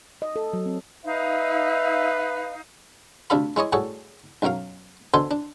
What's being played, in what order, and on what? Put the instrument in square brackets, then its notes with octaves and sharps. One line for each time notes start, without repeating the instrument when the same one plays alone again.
[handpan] D#5
A4
F#3
C4
[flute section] D#4 F5 [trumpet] B4 [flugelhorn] E5
[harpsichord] D2 C3 D4 A4 F5 B5
G#3 E4 C#5 D#5
A2 G3 F#4 G#4 A4
B1 F#2 F#3 A#4 F5
B2 D3 A4 C5 G#5 C6
D4